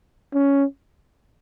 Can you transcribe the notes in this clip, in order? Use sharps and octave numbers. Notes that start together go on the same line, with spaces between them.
C#4